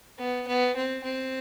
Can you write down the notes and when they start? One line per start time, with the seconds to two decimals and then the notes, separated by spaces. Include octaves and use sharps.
0.19 B3
0.47 B3
0.76 C4
1.04 C4